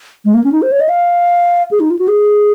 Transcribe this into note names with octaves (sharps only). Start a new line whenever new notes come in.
G#3
A#3
C#4
D#4
C5
C#5
D#5
F5
G#4
D#4
F4
F#4
G#4